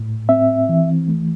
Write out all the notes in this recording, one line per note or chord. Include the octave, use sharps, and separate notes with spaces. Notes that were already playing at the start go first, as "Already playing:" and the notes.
Already playing: A2
C4 E5
E3
A3